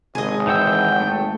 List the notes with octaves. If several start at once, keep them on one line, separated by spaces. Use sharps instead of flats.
G#1 G#4 D#5
E3 F#5 G5 E6
A3